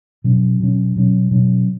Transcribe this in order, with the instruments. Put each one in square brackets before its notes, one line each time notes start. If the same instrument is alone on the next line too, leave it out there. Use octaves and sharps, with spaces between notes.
[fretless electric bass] B2 F#3 C#4
B2 F#3 C#4
B2 F#3 C#4
B2 F#3 C#4